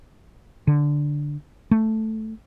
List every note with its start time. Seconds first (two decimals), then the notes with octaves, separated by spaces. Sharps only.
0.67 D3
1.71 A3